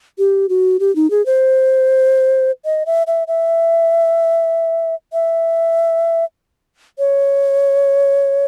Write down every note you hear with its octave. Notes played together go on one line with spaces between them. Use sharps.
G4
F#4
G4
D#4
G#4
C5
D#5
E5
E5
E5
E5
C#5